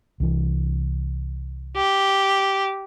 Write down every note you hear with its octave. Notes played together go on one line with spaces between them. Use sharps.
C2 E3
G4